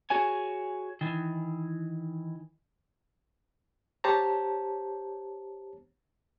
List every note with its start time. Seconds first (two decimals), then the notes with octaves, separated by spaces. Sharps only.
0.10 F#4 G#4 C#5 G#5
1.01 D#3 E3
4.04 G4 C5 C#5 A5 A#5